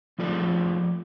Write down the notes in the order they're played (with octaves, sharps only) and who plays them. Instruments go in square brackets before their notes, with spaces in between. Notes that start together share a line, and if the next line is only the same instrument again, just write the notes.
[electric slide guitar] F3 A3 F4 A4 D5